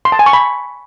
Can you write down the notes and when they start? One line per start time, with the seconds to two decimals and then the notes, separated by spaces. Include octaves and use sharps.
0.05 C6
0.12 A5
0.19 G#5
0.26 C#6
0.33 B5